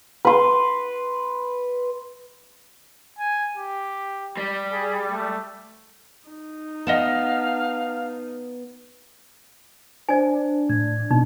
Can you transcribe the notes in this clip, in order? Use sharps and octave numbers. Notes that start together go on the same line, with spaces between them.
B4 C6
G#5
G4
G3
G#4
A3
D#4
B3 D#5 F5 F#5 A5
D4 C5 D5 G#5
A2 G#6
B2 D#4